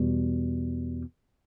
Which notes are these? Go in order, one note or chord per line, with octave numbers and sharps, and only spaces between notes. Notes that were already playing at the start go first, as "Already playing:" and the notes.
Already playing: E2 B2 G3